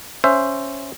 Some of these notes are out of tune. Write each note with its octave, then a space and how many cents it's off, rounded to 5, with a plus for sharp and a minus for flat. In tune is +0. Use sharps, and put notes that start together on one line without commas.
C#4 +0 C5 +0 E5 +15